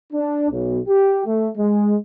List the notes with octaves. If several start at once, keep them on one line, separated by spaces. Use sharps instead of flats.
D4
B1
G4
A3
G#3